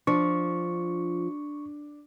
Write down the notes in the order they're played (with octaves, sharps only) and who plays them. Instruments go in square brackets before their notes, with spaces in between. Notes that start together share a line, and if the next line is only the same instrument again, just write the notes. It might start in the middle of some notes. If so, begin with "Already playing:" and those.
[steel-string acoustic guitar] F3 [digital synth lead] D4 [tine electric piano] C#6